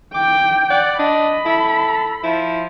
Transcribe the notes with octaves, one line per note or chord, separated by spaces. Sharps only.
G5 D6
D5 F#5
D4 D#5 B5
E4 A4
F3 E4